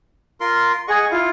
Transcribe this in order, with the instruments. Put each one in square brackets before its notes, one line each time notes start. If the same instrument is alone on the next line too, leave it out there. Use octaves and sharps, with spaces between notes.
[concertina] F4 A#4 C6
[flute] G#4 [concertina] D#5 F#5 C#6
[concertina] E4 [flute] F4